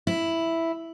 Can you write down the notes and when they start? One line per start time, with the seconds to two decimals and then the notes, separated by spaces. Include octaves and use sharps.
0.07 E4